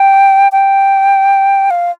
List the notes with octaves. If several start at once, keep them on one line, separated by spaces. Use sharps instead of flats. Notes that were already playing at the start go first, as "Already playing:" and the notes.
Already playing: G5
G5
F5